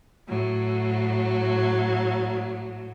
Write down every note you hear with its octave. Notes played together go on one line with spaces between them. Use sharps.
A2 F#3